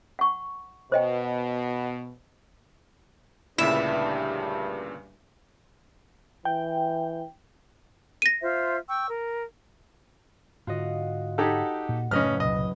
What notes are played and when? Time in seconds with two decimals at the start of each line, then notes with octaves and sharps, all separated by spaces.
0.19 F#5 C#6
0.92 B2 C5 D#5 G5
3.58 D2 G2 A#2 C#3 E4 E5
6.45 E3 G5
8.22 A#6 D#7
8.42 F4 C5 E5
8.89 G5 C#6 E6
9.09 A#4
10.67 G#2 D3 F4 F#4 D#5
11.38 D#4 G4 A4 F#5 G#6 B6
11.89 A#2
12.11 F#1 A2 A3 C#4 B4 D#5 F6
12.40 C2 A#2 D#5